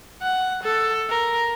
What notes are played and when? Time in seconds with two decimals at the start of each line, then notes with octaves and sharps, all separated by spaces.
0.22 F#5
0.63 A4
1.10 A#4